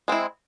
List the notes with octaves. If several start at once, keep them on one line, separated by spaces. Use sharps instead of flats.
G#3 C4 E4